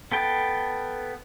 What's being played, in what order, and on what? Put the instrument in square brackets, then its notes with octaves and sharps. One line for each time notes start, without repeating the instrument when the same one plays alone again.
[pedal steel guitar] B3 A4 G5